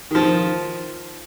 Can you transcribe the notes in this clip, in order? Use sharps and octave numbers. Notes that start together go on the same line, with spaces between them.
D#3 F3